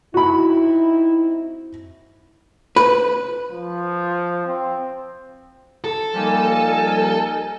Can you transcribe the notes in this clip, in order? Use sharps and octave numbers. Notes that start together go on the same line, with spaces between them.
C4 D#4 E4 F#4 B5
B4
F3
C4
A4
F3 G3 A#3 D#4 A#4 G#5